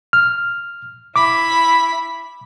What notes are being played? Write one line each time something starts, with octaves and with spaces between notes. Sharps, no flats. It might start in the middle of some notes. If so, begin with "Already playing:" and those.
F6
E4 B5 D6